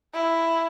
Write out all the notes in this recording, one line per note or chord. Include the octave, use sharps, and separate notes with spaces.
E4